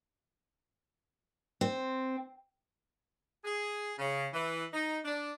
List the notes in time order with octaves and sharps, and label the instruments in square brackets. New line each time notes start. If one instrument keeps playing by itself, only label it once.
[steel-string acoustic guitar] C4
[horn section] G#4
C#3
E3
D#4
D4